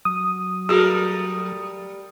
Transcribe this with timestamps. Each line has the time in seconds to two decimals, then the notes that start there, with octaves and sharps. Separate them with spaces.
0.05 F#3 D#6
0.69 G3 A3 F#4 G#4 A#4